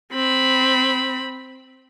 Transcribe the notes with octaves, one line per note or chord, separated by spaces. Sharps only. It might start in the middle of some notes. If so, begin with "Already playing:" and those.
C4 B5